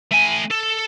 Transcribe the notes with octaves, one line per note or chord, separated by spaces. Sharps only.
A3 G#5
A4